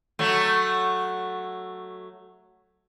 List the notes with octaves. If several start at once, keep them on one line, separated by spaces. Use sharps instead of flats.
F#3 A3